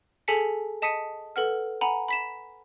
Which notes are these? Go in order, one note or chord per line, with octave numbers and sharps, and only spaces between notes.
G#4 A4 G#5 A5 B6 C#7
D#5 A5 D#6 B6 C#7 D#7
A4 B4 F#5 F6
F#5 G#5 A#5 B5
B5 B6 E7